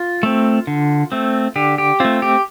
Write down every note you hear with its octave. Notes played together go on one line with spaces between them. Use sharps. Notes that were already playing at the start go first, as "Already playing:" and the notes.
Already playing: F4
A3 C4
D3
A3 C4
D3 G4
G4
A3 C4 F4
G4